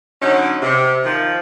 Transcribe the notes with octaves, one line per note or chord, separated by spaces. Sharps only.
D3 F#3 C#4 D#4
C3
D#3 F3